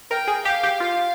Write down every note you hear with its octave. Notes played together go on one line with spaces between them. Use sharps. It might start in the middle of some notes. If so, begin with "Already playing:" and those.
A#4 G5
G#4
G4 F5
G4
F4 F5